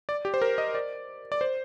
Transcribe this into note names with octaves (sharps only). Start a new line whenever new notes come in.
D5
G4
C5
A#4
D#5
D5
D5
C5